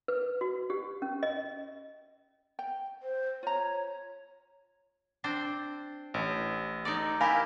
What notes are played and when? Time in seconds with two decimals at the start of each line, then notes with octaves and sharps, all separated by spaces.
0.08 B4
0.41 F#4
0.70 G4
1.02 C#4
1.23 D#5
2.59 G5
3.03 C5
3.43 F4 C#5 A#5
5.24 C4 D4 C5
6.14 A1
6.85 D#4 A4 D5
7.21 E4 G4 A#4 F5 G#5 B5